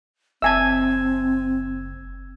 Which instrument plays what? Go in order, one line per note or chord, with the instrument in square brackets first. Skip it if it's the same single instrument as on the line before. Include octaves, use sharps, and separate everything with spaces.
[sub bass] F#1 [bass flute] C4 [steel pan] E5 G#5 A5 [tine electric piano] E6 G#6